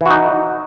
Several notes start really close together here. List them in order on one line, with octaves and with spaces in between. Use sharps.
E3 F#4 D#4